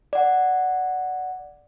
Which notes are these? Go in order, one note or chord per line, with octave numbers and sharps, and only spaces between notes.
D5 F#5